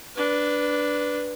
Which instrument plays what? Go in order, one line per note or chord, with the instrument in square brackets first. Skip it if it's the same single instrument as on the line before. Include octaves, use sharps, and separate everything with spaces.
[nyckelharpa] D4 B4